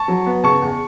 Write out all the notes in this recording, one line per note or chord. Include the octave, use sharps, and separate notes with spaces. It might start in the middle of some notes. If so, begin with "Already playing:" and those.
Already playing: A5 C#6
F#3
B3
C#3 A5 C#6
E2